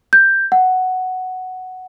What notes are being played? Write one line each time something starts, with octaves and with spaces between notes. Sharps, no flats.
G6
F#5